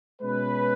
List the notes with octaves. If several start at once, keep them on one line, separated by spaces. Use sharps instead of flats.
B2 G#3 C#4 B4